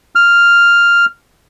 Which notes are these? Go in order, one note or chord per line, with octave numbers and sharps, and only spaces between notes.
F6